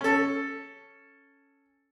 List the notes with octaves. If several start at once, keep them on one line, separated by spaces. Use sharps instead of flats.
C#4 A4